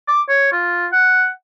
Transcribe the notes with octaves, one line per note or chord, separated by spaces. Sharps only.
D6
C#5
F4
F#5